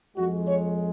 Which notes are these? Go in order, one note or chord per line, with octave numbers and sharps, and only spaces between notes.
F2 F3 G#3 F#4
C#5